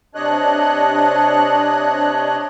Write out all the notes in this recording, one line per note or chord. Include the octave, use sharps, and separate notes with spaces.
C3 D4 C#5 D#5 F#6